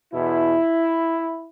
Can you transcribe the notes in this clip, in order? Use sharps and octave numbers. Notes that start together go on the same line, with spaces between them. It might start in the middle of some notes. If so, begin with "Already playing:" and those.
E2 B2 E4